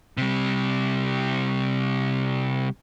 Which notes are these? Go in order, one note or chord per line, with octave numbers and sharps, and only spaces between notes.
C3 G3